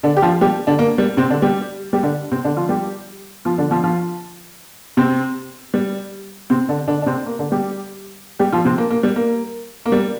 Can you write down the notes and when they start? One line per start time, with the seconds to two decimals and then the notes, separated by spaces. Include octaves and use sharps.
0.03 D3 D4
0.17 G4
0.22 F3 F4
0.41 G3 G4
0.67 D3 D4
0.79 A#3
0.98 G3
1.17 C3 C4
1.30 D3 D4
1.42 G3 G4
1.93 G3 G4
2.03 D3 D4
2.32 C3 C4
2.45 D3 D4
2.57 F3 F4
2.69 G3 G4
3.45 F3 F4
3.58 D3 D4
3.71 F3 F4
3.84 F3 F4
4.97 C3 C4
5.74 G3
6.50 C3 C4
6.69 D3 D4
6.88 D3 D4
7.02 D4
7.06 C3 C4
7.26 A#3
7.39 D3 D4
7.52 G3 G4
8.39 G3 G4
8.53 F3 F4
8.65 C3 C4
8.78 A#3
8.90 A#3
9.03 G3
9.16 A#3
9.86 A#3
9.92 G3